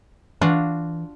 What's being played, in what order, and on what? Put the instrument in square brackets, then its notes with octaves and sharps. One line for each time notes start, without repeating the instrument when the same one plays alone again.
[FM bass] E3 [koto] D4 F4 F#4